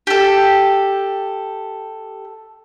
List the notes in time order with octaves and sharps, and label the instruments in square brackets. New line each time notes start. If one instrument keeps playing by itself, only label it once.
[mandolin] G4 A4